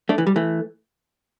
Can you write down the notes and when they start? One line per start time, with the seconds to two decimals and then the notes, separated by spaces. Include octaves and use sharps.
0.09 A3 D4
0.18 E3
0.27 G3
0.36 E3 A3